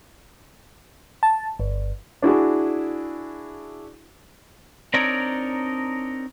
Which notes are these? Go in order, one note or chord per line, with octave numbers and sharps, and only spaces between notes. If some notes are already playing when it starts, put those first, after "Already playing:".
A5
G1
D4 E4 F#4 G#4
C4 D4 D#4 A#4 C#5 D5